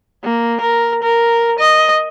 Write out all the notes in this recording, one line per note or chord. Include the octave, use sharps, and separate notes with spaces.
A#3
A#4
A#4
D#5